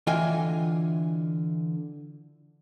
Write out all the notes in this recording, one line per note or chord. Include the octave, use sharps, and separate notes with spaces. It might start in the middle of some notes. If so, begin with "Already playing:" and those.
D3 E3 F4 D#5 G5 G#5